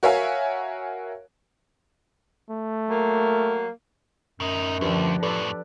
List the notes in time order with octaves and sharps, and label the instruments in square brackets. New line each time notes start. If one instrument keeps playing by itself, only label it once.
[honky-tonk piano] F#4 A#4 C#5 E5 F5 G#5
[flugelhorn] A3
[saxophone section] F#3 A#3
[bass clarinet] F#2 [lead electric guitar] A2 D#4
[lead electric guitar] D2 [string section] F3 [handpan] D4 G4 B4
[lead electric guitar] F#2 A2 [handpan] A4 B4 D5